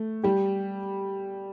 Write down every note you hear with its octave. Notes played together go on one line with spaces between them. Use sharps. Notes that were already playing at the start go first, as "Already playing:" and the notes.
Already playing: A3
G3 G4